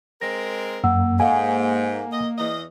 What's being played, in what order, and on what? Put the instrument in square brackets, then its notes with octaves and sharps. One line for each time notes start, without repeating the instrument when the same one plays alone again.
[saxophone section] G#3 C4 A#4 [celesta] A#6
[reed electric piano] F#2 [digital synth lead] A#3 [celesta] F#5 E6
[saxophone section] G#2 [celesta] A4 F5 F#5 [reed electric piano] G#5
[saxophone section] D#5
E2 D#5